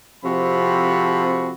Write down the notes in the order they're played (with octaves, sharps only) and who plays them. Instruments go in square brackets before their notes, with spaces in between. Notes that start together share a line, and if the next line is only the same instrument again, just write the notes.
[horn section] C3 F3 C4 F#4 A4 B5